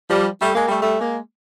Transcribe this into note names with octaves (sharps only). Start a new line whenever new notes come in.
F3 G3
G3 A3
G#3 A#3
G3 A3
G3 A3
G#3 A#3